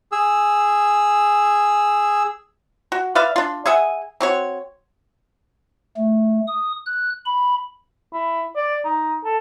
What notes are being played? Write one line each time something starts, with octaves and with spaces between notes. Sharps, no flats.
G#4 E6
F#4
B4 D5 E5 F5
D4 F4
G#4 E5 F#5 G#5
C4 F#4 C#5
A3
D#6
F#6
B5
E4
D5
D#4
A4